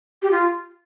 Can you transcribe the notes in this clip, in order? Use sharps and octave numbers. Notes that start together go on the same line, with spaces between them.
G4
F4